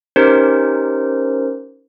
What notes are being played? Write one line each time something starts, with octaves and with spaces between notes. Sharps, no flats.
C#4 D#4 G4 A#4 C5